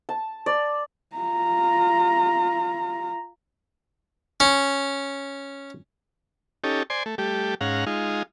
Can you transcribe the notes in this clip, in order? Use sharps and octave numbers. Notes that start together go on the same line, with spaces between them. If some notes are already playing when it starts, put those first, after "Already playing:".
A5
D5
F4 A#5
C#4
C#4 D#4 G4 A4
C5 D5 G#5 C6
A3
G3 A3 G4
G#2 C#4 F5 F#5 A#5
G#3 D#4 F4